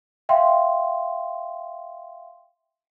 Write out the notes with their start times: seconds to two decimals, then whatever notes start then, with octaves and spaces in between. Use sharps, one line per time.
0.29 E5 F5 G5 C6